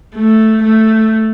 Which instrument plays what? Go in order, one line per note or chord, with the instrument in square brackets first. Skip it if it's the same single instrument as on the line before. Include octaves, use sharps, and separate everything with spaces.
[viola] A3
A3